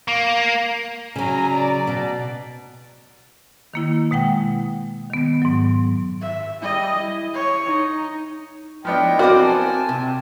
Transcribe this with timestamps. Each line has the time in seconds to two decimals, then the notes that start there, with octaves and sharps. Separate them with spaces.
0.08 A#3
1.16 C#3 F#3 G#5 A#5
1.54 D5
1.87 B2
3.74 D#3 A#3 E4
4.11 B2 G#3 F#5 G5
5.10 D#3 B3
5.42 G#2 F#3
6.22 E5
6.60 G3 D#5
6.99 E4
7.34 C#5
7.65 D#4
8.85 F3 B3 D4 E4 D#5 G5
9.19 B3 C4 F#4 A#4 C5 D5
9.42 G#5 A5
9.89 C3